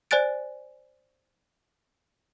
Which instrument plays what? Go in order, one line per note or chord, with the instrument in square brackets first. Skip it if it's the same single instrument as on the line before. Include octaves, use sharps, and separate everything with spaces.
[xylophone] C5 D5 G#5 F#6 A6 D7